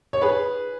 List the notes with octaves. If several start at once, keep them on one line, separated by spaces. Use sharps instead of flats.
C#5
G#4 B4